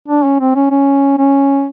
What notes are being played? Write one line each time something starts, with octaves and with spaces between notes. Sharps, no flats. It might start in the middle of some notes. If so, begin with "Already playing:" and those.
D4
C#4
C4
C#4
C#4
C#4